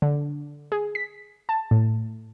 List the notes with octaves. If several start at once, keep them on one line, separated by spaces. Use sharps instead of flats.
D3
G#4
B6
A5
A2